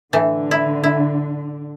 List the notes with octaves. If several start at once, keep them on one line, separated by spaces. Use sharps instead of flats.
A2 D3 E3
E4
E4